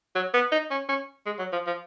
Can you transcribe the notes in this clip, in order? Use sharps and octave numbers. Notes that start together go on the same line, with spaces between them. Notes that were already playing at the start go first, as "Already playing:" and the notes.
F#3
B3
D#4
C#4
C#4
G#3
F#3
F3
F3